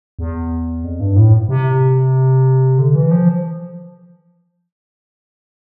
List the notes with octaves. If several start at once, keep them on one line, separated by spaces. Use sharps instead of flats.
E2
F2
G2
A2
C3
D3
E3
F3